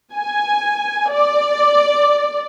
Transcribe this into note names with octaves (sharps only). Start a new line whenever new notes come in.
G#5
D5